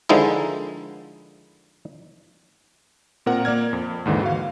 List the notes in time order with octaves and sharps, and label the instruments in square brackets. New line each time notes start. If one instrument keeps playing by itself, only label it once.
[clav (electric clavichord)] D3 D#3 F3 G#3 D#4 E4
[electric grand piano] A#2 C4 A#4 F#5
A#3 D5 F6 G#6
F2
D#2 G#2 D3 E3
F#4 F5